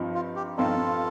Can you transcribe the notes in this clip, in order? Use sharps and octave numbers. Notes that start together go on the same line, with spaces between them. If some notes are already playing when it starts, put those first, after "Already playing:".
Already playing: G2 F3 C4 D#4
F4
G4
G2 F3 C4 D#4 F4 A4